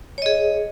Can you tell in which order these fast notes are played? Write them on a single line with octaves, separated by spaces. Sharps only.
C#5 D#5 G#4